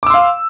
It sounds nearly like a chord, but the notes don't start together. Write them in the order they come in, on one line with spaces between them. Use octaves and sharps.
D6 E6 C6 F5